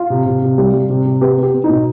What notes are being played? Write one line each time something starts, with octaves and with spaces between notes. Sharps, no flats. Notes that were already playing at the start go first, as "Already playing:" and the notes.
Already playing: F4
C3
C3
C3
G3
G3
C3
C3
B3 G4
B3
G4
B3
D#4
B2